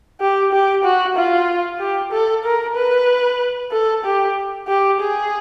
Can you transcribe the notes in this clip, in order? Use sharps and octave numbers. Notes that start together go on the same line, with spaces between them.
G4
G4
F#4
F4
G4
A4
A#4
B4
A4
G4
G4
G#4